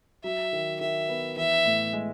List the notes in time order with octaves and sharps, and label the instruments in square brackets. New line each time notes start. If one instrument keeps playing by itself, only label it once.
[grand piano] F#3 [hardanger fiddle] E5
[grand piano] D#3
[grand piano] D#3 [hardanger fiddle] E5
[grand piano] B3
[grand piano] E3 [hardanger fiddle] E5
[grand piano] A2
G#3